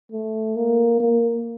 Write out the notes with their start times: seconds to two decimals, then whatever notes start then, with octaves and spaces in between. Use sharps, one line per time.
0.12 A3
0.56 A#3
1.00 A#3